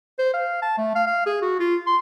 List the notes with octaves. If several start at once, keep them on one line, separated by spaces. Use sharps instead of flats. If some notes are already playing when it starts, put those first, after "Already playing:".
C5
F5
A5
A3
F5
F5
G#4
F#4
F4
C6